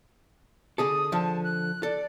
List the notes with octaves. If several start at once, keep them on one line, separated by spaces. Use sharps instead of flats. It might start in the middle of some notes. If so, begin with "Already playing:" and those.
D3 G#4 A4 D#6
D3 F3 A5
F#6
A4 D5